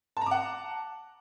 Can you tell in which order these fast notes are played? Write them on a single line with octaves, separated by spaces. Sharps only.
A5 A#5 D6 F#5